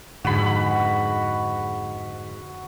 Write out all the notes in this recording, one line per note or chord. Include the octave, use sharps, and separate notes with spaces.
F2 G#2 D3 F#4 B5